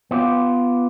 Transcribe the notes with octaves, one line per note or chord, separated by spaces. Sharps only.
B3 F4 G4